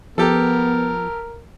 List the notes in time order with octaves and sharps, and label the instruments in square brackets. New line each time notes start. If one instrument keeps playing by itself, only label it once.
[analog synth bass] F3 [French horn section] B3 [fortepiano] G4 A4 [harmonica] A#4